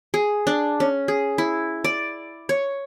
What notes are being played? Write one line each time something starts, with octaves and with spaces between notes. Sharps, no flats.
G#4
D4
C#4
G#4
E4
D5
C#5